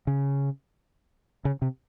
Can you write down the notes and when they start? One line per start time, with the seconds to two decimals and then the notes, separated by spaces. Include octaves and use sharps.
0.07 C#3
1.45 C#3
1.62 C3